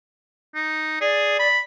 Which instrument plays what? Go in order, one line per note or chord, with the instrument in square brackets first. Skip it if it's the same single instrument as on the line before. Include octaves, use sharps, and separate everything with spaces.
[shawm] D#4
[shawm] G#4 [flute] D5
[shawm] B5